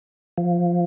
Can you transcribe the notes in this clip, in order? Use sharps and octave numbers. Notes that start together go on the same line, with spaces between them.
F3